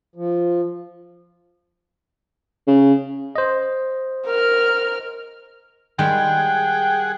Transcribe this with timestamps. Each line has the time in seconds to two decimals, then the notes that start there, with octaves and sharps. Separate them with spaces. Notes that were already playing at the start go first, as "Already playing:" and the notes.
0.16 F3
2.67 C#3
3.36 C5 D#5
4.26 A#4 F6
5.99 D#3 G3 G#3 G#4 F#5 G5